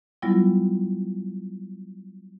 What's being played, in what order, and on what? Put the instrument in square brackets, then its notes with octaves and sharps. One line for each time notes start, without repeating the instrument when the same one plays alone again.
[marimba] F#3 G3 B3 E4 F4